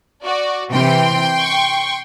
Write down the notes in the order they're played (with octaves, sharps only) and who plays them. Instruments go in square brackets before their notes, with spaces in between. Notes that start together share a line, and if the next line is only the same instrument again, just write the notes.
[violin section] F#4 D5
[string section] C3 E3 [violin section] G5 C6
[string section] C#6